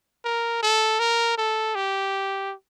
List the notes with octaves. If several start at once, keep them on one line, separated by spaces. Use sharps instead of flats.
A#4
A4
A#4
A4
G4